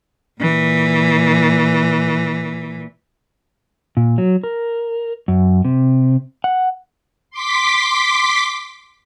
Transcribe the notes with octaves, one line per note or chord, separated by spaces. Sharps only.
A#2 E3
A#2
F#3
A#4
F#2
C3
F#5
C6 D6 B6